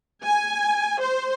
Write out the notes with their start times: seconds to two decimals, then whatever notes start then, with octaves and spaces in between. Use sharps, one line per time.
0.23 G#5
1.00 C5